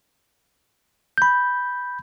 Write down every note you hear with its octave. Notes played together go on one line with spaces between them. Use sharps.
B5 G6